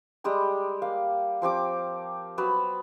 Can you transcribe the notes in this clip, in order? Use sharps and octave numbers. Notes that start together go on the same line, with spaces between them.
G3 G#3 G4 A#5
A#3 F5
F3 C4 G4 D6
F#3 B3 B5